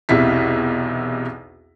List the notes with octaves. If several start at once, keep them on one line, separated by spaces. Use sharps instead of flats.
B1 E2 C3 E4 B6